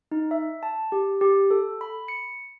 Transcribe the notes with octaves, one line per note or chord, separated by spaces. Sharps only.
D#4
E5
A5
G4
G4
A4
B5
C#7